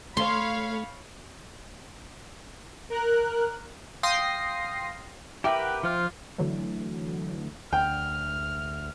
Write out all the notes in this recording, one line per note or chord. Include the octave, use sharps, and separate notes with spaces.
A3 C#5 F5 B5 C6
A#4 F#6
F5 G5 C6 D#6 A#6 C7
G4 A#4 B4 E5 G5 D6
F#5
F3 F4 C5 F6
D3 E3 F#3 A3
D2 G5 F6